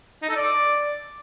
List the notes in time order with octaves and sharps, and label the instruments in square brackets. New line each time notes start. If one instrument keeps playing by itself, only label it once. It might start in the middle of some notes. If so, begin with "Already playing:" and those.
[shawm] D#4
A4
D5